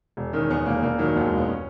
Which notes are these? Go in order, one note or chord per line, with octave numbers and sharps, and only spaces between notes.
E1
D#3 C#4
E2 B3
E1 A#3
E1 A#3
D#3 F#3
D#2 F#3
G#3
E1
B3
C#4